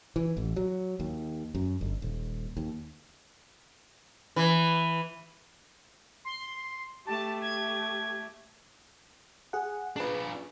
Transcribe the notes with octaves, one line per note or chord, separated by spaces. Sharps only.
E3
A1
F#3
D#2
F#2
G1
D#1
D#2
E3
C6
A3 G4 A5
G#6
G#4 F#5
D4 F4 G#4 B4